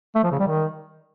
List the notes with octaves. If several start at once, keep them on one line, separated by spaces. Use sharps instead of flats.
A3
F3
C#3
G3
D#3